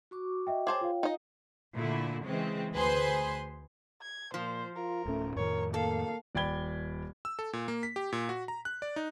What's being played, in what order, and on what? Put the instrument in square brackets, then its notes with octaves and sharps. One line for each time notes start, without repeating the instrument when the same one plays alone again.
[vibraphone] F#4 C#6 D6
[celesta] D#5 E5 G5
[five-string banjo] G#4 C5 A5 [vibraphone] C#5 G5 [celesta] D6
[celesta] F4 F5
[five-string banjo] D#4 D#5
[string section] A#2 D3 A3 E4
C#3 E3 G#3 C4
D2 G#4 B4 C5 C6
[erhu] G#6
[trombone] A#2 [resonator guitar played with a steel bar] F3 [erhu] C5
[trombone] F4 [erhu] A#4
[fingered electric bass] D1 A2 C#4 [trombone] A3
[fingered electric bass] F2 A2 D#3 [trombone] A#4 [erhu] C#5
[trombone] A#3 [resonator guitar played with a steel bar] A4 [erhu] F5
[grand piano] D#1 D5 G5 B5 G#6 G7
[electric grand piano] E6
A4
A#2
A#3
B6
G4
A#2
F#4
A#5
F#6
D5
D#4